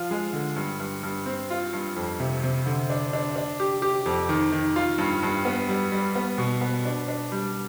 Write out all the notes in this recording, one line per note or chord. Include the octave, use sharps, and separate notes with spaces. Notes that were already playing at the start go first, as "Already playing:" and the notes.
Already playing: F3 F4
G#3
D3
G2
G2
G2
C4
F4
G2
F2
C3
C3
D3
D4
D4
D4
G4
G4
F2
D#3
D#3
F4
G2
G2
B3
G3
G3
B3
B2
B3
D4
D4
G3